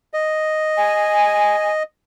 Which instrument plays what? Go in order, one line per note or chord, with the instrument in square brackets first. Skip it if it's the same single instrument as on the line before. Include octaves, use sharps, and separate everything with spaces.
[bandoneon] D#5
[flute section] G#5